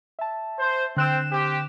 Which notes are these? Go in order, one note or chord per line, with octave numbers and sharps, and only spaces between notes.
E5 A5
C5
D3 C4 F#6 E7
C4 G4